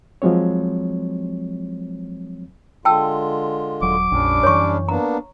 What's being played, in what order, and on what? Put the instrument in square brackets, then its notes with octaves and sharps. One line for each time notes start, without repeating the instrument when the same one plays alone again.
[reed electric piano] F3 F#3 G#3 C4 C#5
[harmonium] D3 G#3 F4 [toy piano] G5 A5 E6
[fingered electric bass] D#1 F#3 [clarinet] D6
[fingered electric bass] A#1 F2 [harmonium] G3 C#4 D4
[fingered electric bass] F#2 E3 [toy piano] C#5 C#6
[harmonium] A#3 B3 D4 [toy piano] A#5